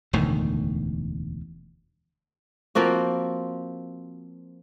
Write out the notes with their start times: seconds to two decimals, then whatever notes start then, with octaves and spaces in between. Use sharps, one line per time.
0.13 E1 D2 A2 D#3
2.75 F3 A#3 C4 F#4